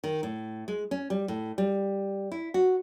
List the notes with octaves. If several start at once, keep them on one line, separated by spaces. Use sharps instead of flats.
D#3
A2
G#3
C#4
G3
A2
G3
E4
F#4